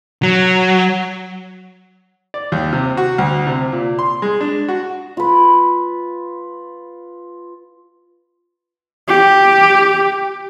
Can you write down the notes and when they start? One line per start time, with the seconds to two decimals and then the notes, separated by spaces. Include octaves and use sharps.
0.23 F#3
2.34 D5
2.52 D#2
2.72 C3
2.97 F#4
3.18 D2
3.47 C3
3.72 A#2
3.99 C6
4.22 G#3
4.41 D4
4.69 F#4
5.17 F4 B4
9.08 G4